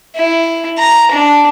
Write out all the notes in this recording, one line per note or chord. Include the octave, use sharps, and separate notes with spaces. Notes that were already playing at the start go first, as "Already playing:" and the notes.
E4
A#5
D4